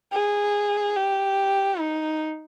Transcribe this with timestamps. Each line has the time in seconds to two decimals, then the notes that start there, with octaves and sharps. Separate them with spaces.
0.13 G#4
0.96 G4
1.79 D#4